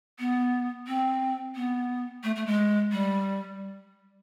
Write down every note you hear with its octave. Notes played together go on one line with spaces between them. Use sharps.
B3
C4
B3
A3
A3
G#3
G3